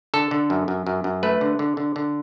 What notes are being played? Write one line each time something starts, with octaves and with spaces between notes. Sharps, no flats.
D3 A4
D3
F#2
F#2
F#2
F#2
A3 B4
D3
D3
D3
D3